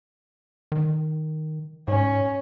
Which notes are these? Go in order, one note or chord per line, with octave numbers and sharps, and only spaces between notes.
D#3
G#2 C#4